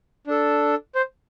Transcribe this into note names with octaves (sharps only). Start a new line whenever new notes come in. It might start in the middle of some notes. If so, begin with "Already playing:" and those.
D4 A4
C5